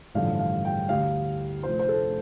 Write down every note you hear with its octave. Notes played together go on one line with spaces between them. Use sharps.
A1 G2 D3 F3 A3 F5
F5
G5
D2 D3 G3 F5
F1 F2 F3 A3 C5
C5
A4